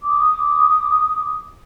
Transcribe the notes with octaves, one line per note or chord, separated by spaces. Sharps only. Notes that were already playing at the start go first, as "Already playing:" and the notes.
D6 D#6